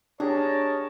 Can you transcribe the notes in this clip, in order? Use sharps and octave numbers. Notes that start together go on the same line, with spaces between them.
D4 G4 G#4 A#4 C#5 D#5 A5